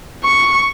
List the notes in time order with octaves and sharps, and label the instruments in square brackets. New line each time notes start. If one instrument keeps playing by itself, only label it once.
[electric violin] C#6